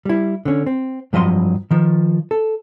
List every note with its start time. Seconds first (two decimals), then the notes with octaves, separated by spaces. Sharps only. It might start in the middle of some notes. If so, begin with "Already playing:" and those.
0.05 G3 E4
0.45 D3 C#4
0.66 C4
1.13 G2 F3 F#3 D#5 C6
1.71 D#3 F3
2.31 A4